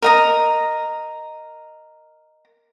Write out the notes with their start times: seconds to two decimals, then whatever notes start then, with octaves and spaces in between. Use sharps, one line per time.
0.02 A#4 D#5 A#5